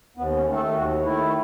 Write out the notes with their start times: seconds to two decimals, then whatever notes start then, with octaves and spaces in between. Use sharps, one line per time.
0.17 D#2 B3
0.36 C#4
0.46 D#3 A3
0.56 A4
0.75 D#2 F#4
1.04 D#3 A3 E4